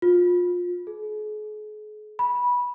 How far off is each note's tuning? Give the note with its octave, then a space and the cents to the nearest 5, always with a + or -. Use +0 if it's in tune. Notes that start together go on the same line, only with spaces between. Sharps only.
F4 +30
G#4 +40
B5 -15